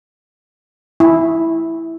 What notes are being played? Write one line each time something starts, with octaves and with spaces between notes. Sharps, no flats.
E4